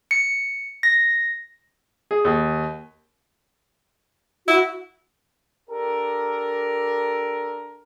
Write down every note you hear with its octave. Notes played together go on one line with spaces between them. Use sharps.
C#7
A#6
G#4
D#2
E4 F#4
D4 G4 A4 A#4